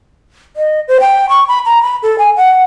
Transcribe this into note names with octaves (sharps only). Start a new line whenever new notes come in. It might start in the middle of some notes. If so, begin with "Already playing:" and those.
D#5
C5
G5
C#6
B5
A#5
B5
A4
G#5
F#5